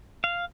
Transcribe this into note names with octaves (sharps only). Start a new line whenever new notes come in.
F5